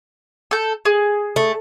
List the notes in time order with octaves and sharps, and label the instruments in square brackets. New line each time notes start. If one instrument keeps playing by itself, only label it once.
[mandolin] A4 G6
G#4
[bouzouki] A3